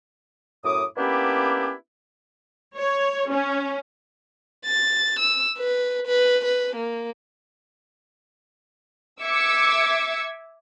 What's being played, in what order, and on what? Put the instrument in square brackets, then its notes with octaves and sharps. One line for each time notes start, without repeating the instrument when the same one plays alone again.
[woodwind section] F#2 A2 D6 D#6
A#3 B3 C#4 D4 E4 G4
[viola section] C#5
C#4
[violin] A6
E6
B4
B4
B4
A#3
[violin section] E5 D6 E6 G#6 C#7